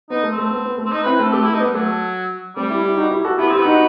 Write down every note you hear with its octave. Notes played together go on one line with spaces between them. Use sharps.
B3 D#4
A3
C4
A3
B3
B3
A3
C4
D#4
B4
C4 E4
B4
A3 C4
A4
A3 G4
E4
A3
D#4
B3
G3
F#3 A3
G3 A3 C4
E4 G4
E4 G4
D#4 F#4
E4 G4
F#4 A4
B3 E4 G4
C4 E4 G4
B3
D#4 F#4